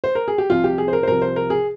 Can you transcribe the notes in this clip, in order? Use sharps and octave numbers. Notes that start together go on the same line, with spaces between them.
C5
A#4
G#4
G4
C2 C3 F3 F4
G4
G#4
C5
A#4
C5
C2 C3 F3 A#4
C5
A#4
G#4